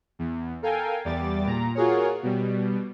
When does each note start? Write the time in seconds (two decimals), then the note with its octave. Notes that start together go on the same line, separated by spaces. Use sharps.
0.19 E2
0.62 A4 A#4 F5 G5 G#5
1.05 E2 G3 D6 A6
1.46 A#2 A#5
1.75 F4 F#4 G#4 A#4 C#5
2.23 B2 G3